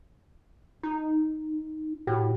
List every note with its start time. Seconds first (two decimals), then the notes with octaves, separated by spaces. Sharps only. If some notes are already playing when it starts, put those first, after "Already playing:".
0.83 D#4
2.07 A2 F#4 G4